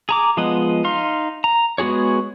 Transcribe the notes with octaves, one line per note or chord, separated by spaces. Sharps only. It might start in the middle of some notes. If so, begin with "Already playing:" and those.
G#4 A#5 D6
F3 G#3 B3 D#5 F#5
D#4 F5 C6
A#5
G#3 B3 F#4 G#4 C#5